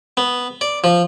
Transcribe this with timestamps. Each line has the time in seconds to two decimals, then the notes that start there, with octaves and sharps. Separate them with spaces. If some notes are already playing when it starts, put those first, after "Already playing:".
0.17 B3
0.61 D5
0.84 F3